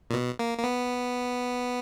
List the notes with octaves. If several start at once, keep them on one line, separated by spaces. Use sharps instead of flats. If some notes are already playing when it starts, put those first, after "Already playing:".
A#2
B2
A#3
A#3
B3